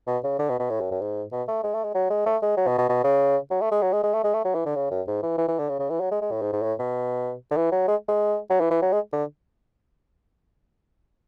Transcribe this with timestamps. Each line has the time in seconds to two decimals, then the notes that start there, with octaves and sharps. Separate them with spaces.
0.07 B2
0.24 C#3
0.39 D3
0.49 B2
0.59 B2
0.70 A2
0.80 F#2
0.91 F#2
1.01 G#2
1.32 B2
1.48 A3
1.64 G#3
1.74 A3
1.84 G#3
1.94 F#3
2.10 G#3
2.26 A3
2.42 G#3
2.57 F#3
2.67 B2
2.78 B2
2.89 B2
3.04 C#3
3.50 F#3
3.61 A3
3.71 G#3
3.82 F#3
3.92 G#3
4.03 G#3
4.14 A3
4.24 G#3
4.34 A3
4.45 F#3
4.55 E3
4.66 D3
4.75 C#3
4.91 F#2
5.07 G#2
5.22 E3
5.38 E3
5.48 E3
5.59 D3
5.69 C#3
5.79 C#3
5.90 E3
6.00 F#3
6.11 G#3
6.21 G#3
6.31 A2
6.42 G#2
6.52 G#2
6.63 A2
6.79 B2
7.51 D3
7.57 E3
7.72 F#3
7.88 G#3
8.08 G#3
8.50 F#3
8.60 E3
8.71 E3
8.82 F#3
8.92 G#3
9.13 D3